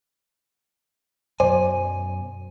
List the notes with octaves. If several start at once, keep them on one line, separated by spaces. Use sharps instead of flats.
F#2 B2 F#3 C5 D5 G#5